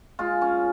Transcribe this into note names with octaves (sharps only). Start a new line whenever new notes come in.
G#3 F4
C#4